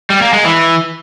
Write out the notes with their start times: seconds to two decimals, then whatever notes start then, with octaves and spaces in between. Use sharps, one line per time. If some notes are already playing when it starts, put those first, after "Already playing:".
0.10 G3
0.22 A#3
0.33 G#3
0.45 E3